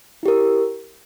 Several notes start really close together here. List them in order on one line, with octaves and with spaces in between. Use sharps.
E4 G4 A#4